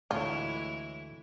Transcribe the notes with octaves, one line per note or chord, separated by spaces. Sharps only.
D2 A2 E3 G#3 E4 F4 C#5